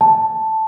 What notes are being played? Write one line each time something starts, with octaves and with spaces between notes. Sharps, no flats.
A5